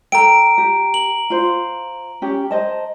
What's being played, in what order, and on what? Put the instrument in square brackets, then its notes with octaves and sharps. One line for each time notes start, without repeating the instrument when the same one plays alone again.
[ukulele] A4 G5 [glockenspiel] A#5 D7
[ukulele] G4
[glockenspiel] F#7
[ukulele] F4 C5
C#4 G4
C5 D#5 A5